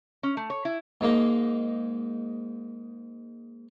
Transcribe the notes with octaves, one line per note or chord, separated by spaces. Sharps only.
C#4
A3
C#5
E4
G#2 G#3 A#3 D#4